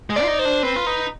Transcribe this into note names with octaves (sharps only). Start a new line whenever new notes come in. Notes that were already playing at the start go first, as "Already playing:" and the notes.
G#3
D5
F4
D#4
C5
D4
C4 B4
F4
D#4 B4